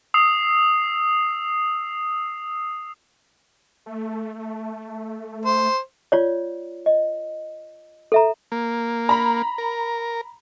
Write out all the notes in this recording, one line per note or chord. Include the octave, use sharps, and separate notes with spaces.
D#6 E6 C7
A3
C5
F4 C#5 D5
D#5
A4 E5 A#5
A#3
A#5 B5
A#4